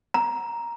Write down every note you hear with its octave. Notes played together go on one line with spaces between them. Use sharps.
A#5